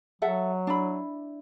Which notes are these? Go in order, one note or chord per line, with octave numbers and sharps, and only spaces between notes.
F#3 A4 E5 F#5
D4 E4 B5